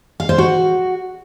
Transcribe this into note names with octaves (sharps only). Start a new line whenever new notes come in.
F5
C5
F#4